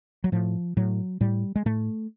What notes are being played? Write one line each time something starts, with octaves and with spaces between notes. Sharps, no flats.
F#3
A2 F3
A2 F#3
A2 G3
G#3
A2 A3